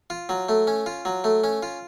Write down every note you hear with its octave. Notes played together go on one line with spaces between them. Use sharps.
F4
F#3
A3
C#4
F4
F#3
A3
C#4
F4